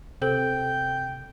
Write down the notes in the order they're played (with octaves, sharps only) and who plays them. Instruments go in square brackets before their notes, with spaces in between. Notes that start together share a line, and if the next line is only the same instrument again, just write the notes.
[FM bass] C3 [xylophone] A4 C5 [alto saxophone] G5